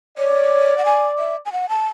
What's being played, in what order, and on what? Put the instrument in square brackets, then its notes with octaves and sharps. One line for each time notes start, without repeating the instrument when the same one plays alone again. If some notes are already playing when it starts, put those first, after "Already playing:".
[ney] C#5 [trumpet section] D5
[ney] F#5
G#5
E5
G#5
F#5
A5